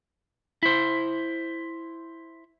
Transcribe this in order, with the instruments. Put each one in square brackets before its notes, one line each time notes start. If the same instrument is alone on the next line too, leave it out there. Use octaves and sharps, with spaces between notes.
[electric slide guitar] E4 C5